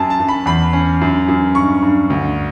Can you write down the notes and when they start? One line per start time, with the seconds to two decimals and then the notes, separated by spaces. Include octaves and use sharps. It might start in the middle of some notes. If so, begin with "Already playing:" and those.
Already playing: F#2 A5
0.10 A5
0.20 F#2
0.28 B5
0.46 E2 B5
0.73 C#4
1.01 F#2
1.28 F#2
1.55 G2 C#6
1.82 G2
2.10 D2